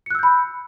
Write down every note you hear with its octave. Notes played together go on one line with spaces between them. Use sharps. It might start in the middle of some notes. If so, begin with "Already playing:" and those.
B5 E6 F#6 G6 C#7